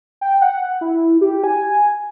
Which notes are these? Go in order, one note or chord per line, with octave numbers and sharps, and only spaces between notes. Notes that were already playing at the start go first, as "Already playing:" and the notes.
G5
F#5
E4
G4
G#5